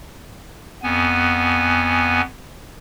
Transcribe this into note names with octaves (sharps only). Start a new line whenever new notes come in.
F2 B3 G#5